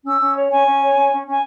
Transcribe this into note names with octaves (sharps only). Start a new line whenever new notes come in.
C#4 E6
C#4
C#5
C#4 G#5
C#4
C#5
C#4
C#4
C#4 G#5